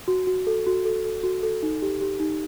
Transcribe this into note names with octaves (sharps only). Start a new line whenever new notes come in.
F#4
F#4
A4
F#4
A4
A4
F#4
A4
D#4
G4
G4
D#4